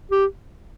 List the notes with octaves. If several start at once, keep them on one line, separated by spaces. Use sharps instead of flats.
G4